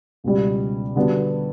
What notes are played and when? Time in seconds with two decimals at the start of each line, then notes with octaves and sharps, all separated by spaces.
0.24 C#2 B2 G3
0.96 D3 G3 B3 D4 F#4